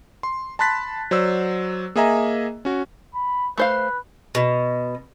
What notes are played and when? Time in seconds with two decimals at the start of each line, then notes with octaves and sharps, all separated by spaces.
0.23 C6
0.59 A5 B5 C6 F#6 A6 B6
1.11 F#3 C5 D5 E6
1.96 A#3 G#4 D#5 E5 G#5 A#5
2.65 C#4 F#4
3.14 B5
3.58 A3 B4 C5 F5
4.35 B2